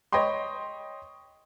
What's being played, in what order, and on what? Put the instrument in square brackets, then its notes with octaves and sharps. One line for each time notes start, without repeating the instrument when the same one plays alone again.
[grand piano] C#5 D#5 G5 B5 C6